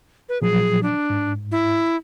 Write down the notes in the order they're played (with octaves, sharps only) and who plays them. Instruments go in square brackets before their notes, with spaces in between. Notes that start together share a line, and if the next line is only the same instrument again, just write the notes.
[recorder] B4
[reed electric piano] A#2 F3 F#3 [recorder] G#4
[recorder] D4
[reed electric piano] G#2
[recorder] E4